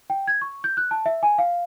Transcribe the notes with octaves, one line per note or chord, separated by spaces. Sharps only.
G5
G#6
C#6
G6
F#6
A5
E5
G#5
F5